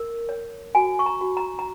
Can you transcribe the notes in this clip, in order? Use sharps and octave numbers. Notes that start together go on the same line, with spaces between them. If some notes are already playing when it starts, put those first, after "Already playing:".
Already playing: A#4
C#5
F#4 G#5
C#6
A#5
F#4
A#5
A#5